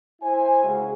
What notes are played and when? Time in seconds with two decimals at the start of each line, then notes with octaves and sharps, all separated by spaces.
0.22 E4 C5 G#5
0.62 C#3 G#3 F#4 G#4